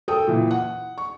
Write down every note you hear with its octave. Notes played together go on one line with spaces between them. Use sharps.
A4 G5 D#6
A#2 E3
F#5
C#6